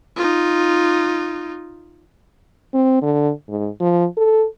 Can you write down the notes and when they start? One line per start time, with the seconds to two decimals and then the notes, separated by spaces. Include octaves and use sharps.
0.17 D#4 F4
2.74 C4
3.02 D3
3.49 G#2
3.80 F3
4.17 A4